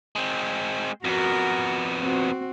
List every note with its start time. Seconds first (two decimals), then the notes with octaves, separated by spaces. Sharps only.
0.16 G#3 C4
1.05 F2 B3 F#4 A#4
2.02 C4 F#4